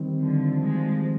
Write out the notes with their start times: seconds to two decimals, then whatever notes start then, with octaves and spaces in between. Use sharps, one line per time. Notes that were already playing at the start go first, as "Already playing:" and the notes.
Already playing: D#3 G3 C4
0.21 D3 F3
0.63 F3 G#3